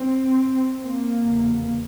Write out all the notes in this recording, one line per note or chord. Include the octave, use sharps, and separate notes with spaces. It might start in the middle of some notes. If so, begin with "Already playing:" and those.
Already playing: C4
A#3
F1 E2 C#3